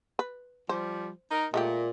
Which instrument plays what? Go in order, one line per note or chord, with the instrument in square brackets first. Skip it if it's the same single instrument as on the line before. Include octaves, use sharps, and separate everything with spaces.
[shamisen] B4
[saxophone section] F3 G3 [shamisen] C5
[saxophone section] D#4 A#4
[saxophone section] A#2 [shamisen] G#3 A3 G4